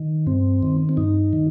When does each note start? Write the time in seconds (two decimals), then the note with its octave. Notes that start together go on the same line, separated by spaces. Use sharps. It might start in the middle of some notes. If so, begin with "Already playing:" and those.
Already playing: D#3
0.27 G2 C4
0.63 D#3
0.89 C4
0.97 G2 D#4
1.33 D#3